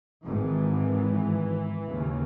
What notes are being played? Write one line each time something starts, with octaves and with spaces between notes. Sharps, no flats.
G#1 G#2 E3
D#2 C#3